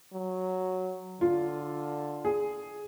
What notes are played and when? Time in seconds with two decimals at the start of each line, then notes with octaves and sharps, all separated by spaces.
0.13 F#3
1.21 D3 F4
2.25 G#4